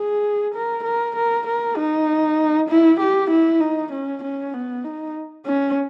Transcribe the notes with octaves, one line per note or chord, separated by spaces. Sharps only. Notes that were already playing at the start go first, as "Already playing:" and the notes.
Already playing: G#4
A#4
A#4
A#4
A#4
D#4
E4
G4
E4
D#4
C#4
C#4
B3
D#4
C#4